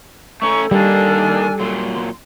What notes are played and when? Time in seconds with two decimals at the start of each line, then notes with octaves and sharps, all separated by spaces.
0.42 A3 C#4 A4 A#5 C#6
0.71 D#3 G3 A#3 D4 G#5
1.60 A#2 F#3 C6